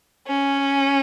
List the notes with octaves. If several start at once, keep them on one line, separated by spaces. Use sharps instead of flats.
C#4